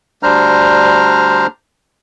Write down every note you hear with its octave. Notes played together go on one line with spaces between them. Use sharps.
D2 G3 D4 C5 A#5 F6